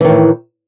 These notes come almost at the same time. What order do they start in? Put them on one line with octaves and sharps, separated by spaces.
E3 D#3 A2